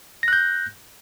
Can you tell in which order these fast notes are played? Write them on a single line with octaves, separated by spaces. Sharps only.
A#6 F#6 G6